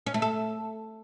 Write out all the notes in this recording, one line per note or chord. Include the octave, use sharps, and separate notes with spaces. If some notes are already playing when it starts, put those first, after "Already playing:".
C#4
A3
A4